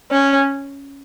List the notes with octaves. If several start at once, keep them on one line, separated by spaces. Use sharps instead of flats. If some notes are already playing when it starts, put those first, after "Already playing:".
C#4